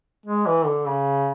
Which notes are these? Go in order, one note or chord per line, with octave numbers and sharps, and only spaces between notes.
G#3
E3
D3
C#3